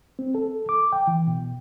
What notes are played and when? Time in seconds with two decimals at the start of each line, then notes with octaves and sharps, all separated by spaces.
0.19 C4
0.35 A4
0.69 D6
0.92 G5
1.07 E3
1.27 B2